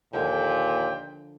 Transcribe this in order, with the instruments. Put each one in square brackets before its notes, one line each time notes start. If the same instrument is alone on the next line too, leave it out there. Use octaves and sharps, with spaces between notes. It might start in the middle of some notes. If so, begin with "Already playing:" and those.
[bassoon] D#2 [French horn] A#2 [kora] D3 F3 [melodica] G5